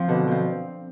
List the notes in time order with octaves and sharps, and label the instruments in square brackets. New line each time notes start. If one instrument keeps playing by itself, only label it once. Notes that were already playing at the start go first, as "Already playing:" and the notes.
Already playing: [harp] F3 C4
[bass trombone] B2 [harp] D3
[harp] F3 C4